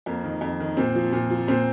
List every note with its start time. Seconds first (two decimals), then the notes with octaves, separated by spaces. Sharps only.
0.06 F2 A#3
0.24 D#3
0.41 F2
0.60 D#3
0.77 A#2 C4
0.95 F3
1.12 A#2
1.30 F3
1.48 A#2 C4